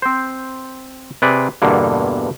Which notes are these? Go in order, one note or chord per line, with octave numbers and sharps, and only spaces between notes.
C4 C5
C3 G#4 B4 D5
E2 G2 B2 D3 A#3